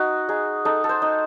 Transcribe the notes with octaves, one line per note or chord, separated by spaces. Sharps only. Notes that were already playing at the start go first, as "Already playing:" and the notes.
Already playing: D#4 F#4
D#4 G#4
D#4 A4
A4
C5
D#4